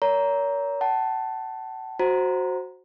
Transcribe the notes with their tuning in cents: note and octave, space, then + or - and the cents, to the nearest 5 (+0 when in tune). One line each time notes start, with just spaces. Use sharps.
A#4 +10 C#5 +40 A#5 +5
F#5 +40 A5 +0
F#4 +0 C5 +5 A#5 +0